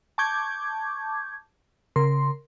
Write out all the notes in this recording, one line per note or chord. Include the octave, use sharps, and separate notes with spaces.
A5 C#6 D6 G6 G#6
C#3 A#4 C6